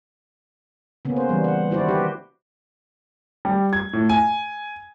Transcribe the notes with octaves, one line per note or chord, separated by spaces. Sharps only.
C#3 A#3 B3 C#4
C5
E3 G3
F#5
D#3 E4 F#4 C5 D5
G4 B4
G3
G#6
A2
G#5